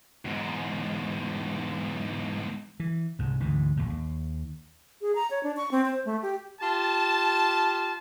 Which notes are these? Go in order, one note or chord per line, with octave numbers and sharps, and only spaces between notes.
E2 G#2
E3
C2 G#2
D2 G#2 E3
A#1 D#2 A2
D#2
G#4
A#5
C#5
D4
C#6
C4
C5
A3
G4
F4 G4 A5